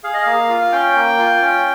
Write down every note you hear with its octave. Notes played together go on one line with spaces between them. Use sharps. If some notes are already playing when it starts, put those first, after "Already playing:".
G#4 F5
D#5
A#3 F5
F4
F5
C#4 G5
A#3
F4
C#4